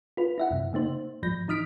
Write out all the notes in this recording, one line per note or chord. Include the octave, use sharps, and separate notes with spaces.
F4 B4
E4 E5 F#5
F#2 C3
C#3 A#3 D#4 C5
G#2 F3 G6 A#6
E3 D#4 D#6 F6 B6 D7